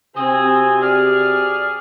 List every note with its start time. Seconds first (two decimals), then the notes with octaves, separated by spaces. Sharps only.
0.16 C3 C4 F#4 G4 G#5 D#6
0.82 G#4 D5 F6